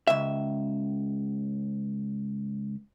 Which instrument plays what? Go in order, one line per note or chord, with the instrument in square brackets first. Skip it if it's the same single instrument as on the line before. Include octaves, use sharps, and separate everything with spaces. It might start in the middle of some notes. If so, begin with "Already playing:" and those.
[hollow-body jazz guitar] C#2 E5